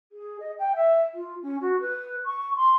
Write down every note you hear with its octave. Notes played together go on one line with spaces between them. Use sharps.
G#4
D#5
G5
E5
F4
C#4
F#4
B4
C#6
C6